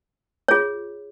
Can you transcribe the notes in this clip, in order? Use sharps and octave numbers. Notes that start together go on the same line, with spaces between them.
F4 G#4 C#5